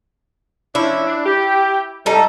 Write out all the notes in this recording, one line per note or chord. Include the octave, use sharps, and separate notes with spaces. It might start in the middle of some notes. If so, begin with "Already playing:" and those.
F3 C#4 D4 E4
D4
G4
G#2 C3 G3 D#4 A4